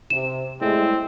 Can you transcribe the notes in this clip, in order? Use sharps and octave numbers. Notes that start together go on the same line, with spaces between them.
C3 E7
A2 G3 G#3 C4 E4